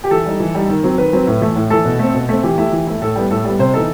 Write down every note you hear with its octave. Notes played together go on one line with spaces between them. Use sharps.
G4
E3 A4
G3 D#4
E3
G3 D#4
D#3
F#3 C4
D#3 B4
F#3 C4
A2
E3 A3
A2
E3 A3 A4
B2
A3 C4
B2
A3 C4
E3 G4
A3 E4
E3
A3 E4
A2 A4
G3 B3
A2 A4
G3 B3
C3 C5
E3 B3 D#4 A4